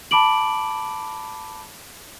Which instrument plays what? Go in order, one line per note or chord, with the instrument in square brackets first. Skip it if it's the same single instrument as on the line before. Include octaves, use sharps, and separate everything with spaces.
[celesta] A5 B5 D6 D7 F#7